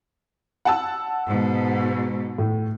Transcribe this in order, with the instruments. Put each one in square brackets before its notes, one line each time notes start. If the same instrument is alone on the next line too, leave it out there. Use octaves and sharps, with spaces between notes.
[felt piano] F#5 A5 E6
[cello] G#2 B2
[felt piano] A2